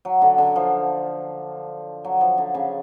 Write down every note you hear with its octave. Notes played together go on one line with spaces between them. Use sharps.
F#3
D3
D3
F3
F#3
F3
D3
C#3